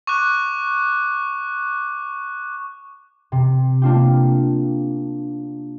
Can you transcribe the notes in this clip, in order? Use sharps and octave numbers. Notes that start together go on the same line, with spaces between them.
C#6 D6 F#6
C3
A#3 D4 F4 G4